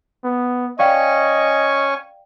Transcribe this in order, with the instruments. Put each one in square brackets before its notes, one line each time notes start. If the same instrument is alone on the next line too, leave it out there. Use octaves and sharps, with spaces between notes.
[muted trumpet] B3
[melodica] C#4 G#5 C#6 [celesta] D5 F5 G5 [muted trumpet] D#5